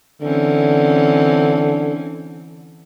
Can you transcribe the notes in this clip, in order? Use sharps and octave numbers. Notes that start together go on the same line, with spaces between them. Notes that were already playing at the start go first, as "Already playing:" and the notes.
D3 E3 C4 C#4